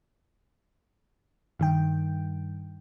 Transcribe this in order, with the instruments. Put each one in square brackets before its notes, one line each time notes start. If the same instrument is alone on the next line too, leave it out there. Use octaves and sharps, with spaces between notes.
[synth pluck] G2 D#3 G5